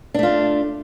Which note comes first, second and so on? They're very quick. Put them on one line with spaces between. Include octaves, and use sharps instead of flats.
D4 A3 F4